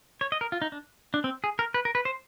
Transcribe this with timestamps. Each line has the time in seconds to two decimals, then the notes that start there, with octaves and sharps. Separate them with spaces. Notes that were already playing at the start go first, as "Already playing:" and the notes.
0.21 C#5
0.32 D#5
0.41 A#4
0.52 F4
0.62 D#4
0.72 D4
1.14 D4
1.24 C4
1.44 G#4
1.59 A#4
1.74 B4
1.85 A#4
1.95 B4
2.05 C5